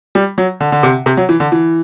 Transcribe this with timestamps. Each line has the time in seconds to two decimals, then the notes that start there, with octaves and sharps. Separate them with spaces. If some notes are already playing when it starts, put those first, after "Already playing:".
0.15 G3
0.38 F#3
0.61 D3
0.72 D3
0.83 C3
1.06 C3
1.17 F#3
1.29 E3
1.40 D3
1.52 E3